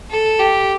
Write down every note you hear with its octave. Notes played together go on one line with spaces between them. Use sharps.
A4
G4